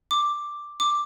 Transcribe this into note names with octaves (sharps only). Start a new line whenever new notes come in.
D6
D6